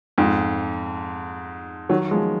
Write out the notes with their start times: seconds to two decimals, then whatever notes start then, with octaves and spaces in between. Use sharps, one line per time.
0.18 F2 G#2
1.89 D#3 F#3
2.11 F3 G#3